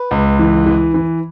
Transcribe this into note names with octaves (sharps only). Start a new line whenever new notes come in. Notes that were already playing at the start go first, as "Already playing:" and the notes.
Already playing: B4
C#2
E3
E3
E3